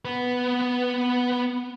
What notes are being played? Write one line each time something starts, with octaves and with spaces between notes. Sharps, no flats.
B3 B4